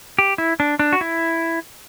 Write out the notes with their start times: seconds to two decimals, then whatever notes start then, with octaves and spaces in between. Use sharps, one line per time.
0.19 G4
0.38 E4
0.60 D4
0.79 D4
0.93 F#4
1.01 E4